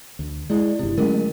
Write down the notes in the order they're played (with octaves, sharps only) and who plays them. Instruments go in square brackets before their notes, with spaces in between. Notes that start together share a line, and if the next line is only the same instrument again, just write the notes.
[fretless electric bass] D2
[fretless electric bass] G#3 [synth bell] E4 D5
[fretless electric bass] G1 C3 [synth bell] E4
[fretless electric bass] D3 F#3 G#3 [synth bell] A3 C#4 A#4